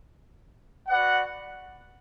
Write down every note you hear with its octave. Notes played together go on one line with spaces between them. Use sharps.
F#4 B4 D5 F#5